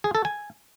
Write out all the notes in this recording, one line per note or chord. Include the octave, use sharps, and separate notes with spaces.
G#4
A4
G#5